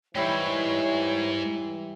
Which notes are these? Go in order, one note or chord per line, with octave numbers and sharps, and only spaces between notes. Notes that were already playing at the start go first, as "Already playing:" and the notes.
G#2 E3 G3 E4 C#5